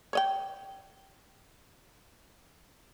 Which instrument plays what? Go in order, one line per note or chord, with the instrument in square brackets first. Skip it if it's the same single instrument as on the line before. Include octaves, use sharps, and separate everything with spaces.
[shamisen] C#5 D#5 G5